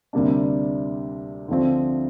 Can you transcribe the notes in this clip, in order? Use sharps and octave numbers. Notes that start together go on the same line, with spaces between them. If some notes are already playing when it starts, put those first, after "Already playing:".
D2 C3 G3 A#3 D4
D2 D3 F3 C4